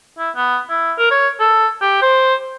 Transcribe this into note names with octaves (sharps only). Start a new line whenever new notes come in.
E4
B3
E4
A#4
C#5
A4
G4
C5